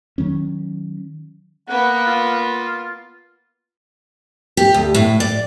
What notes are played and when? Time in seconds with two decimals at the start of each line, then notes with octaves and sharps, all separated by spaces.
0.18 D#3 F#3 C#4
1.68 A#3 B3 F#5
2.07 F4
4.57 G4
4.74 D2
4.94 A2
5.20 D5